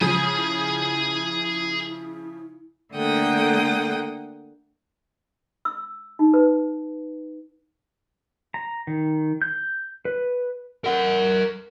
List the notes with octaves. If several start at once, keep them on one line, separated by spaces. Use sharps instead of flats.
C#3 F3 G#4 G#5
E4
D3 A3 A#3 F#5 G5 D#6
E6
D#4
B4
A#5
D#3
G6
B4
A#4 F#5